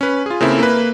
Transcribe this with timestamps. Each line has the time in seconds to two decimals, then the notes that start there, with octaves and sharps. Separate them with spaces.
0.01 C#4 B4
0.26 F4 G#4
0.40 C#3 A#3 C4 E4 A4
0.59 A#3 B4